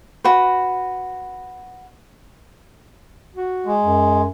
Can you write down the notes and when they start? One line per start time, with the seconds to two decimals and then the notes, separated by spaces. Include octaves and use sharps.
0.24 F#4 B4
3.35 F#4
3.66 G#3
3.83 F#2